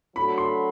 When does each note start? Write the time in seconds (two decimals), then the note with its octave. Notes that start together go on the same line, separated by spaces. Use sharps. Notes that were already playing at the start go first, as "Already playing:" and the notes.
0.15 F#3 A3 D4 F#4 A4 B5
0.38 C6